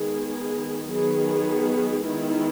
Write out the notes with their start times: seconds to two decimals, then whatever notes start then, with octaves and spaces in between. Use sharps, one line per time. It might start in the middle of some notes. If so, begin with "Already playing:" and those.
Already playing: D#3 G#3 B3 G#4
0.90 D#3 F#3 B3 G#4
2.04 D#3 G#3 B3 E4